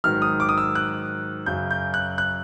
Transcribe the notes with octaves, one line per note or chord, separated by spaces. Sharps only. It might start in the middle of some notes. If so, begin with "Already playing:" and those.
G#2 D#3 F#3 F6
D#6
D6
D#6
E6
F#6
F#2 C#3 F#3 G6
G6
F#6
F#6